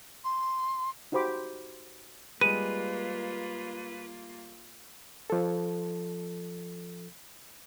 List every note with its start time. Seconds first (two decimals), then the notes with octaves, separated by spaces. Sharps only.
0.24 C6
1.12 D#4 F#4 G4 C5 B5 D6
2.41 G3 G#3 A#3 F4 G#4 B4 D#7
5.30 F3 A4